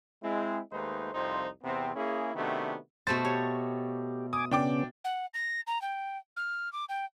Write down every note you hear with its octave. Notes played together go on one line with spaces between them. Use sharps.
G#3 C4 E4
D#2 G#3 A3 D#4 B4 C5
C2 F2 F3 D#4 C5
E2 C3 B3 C4
A#3 C#4 E4 G#4
C3 D#3 A3 B3 D4 F#4
B2 A3 C5 A6
G4 C#5
G#5 D6 D#6
C#3 B3 C#4 D4 G5 D6
F#5
A#6
A#5
G5
F6
D6
G5